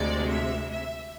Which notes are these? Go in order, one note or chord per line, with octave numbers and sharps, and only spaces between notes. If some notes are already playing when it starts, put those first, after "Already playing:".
Already playing: D2 C3 G#3 D5
E5
E5